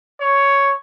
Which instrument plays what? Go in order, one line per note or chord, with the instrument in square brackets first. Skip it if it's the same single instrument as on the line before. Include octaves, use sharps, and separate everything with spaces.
[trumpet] C#5